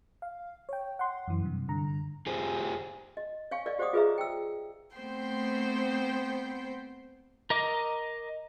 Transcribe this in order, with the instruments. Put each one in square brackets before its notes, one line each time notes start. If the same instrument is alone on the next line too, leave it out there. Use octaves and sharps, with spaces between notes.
[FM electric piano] F5
C#5 G5
F#5 C6
F#2 E3
G2 C3
G2 D3 A#5
[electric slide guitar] F4 G4 G#4 C5
[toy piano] D#5
C#5 F5 G#5 C#6
A#4 D5 D#5 F5
G4 C5 D5 F#5 D6 D#6
F4 G#4 B4 D#5 E5 A#5
G5 E6
[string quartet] A3 B3 C4 C5 G5 C6
[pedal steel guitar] A#4 D#5 D6